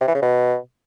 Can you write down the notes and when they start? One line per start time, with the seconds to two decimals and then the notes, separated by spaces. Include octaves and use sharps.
0.01 C3
0.08 E3
0.15 C#3
0.22 B2